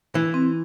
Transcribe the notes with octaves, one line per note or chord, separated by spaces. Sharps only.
E3 E4
C4